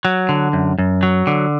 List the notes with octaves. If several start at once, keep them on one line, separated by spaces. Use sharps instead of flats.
F#3
D3
F#2
F#2
F#3
D3